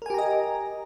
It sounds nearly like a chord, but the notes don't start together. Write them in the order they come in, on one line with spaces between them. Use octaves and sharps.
A#4 G#5 G4 A#5 D#5